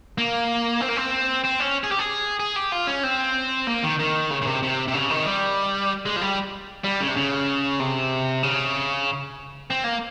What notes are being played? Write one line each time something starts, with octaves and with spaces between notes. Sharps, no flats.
A#3
C4
A#3
C4
C4
C#4
G#4
G4
G#4
G#4
G4
F4
C#4
C4
A#3
D#3
D#3
C#3
C#3
C3
C3
C3
C#3
D#3
G3
G#3
F3
G3
G3
C#3
C3
C#3
C3
C#3
C4
A#3